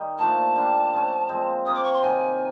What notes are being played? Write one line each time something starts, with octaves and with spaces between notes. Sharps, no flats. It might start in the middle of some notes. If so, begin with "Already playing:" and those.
Already playing: D#3 G3
A#2 F3 A3 D4 A5
D3 G3 A#3 D4
F3 A3 C#4
A#2 F3 G#3 C4
C3 F3 A#3 D#6
D6
C#6
C6
C3 D#3 F#3 A#3 G#5